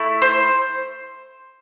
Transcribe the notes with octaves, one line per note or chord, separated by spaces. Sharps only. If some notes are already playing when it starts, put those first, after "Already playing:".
Already playing: A3 E4
C5